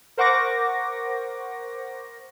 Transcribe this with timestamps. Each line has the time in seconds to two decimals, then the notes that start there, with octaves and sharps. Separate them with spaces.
0.17 A#4 C5 F#5 C#6 D6 A#6